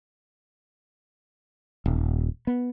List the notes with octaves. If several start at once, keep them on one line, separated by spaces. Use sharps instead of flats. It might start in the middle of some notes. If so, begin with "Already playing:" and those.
D#1
B3